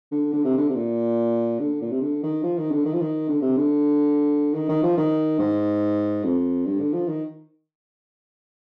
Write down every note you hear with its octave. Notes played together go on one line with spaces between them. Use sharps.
D3
D3
C3
D3
C3
A#2
D3
A#2
C3
D3
D#3
F3
D#3
D3
D#3
F3
D#3
D3
C3
D3
D#3
D#3
F3
D#3
G#2
F2
G2
D3
F3
D#3